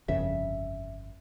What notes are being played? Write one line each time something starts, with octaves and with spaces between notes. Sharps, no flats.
G1 F2 C#3 E5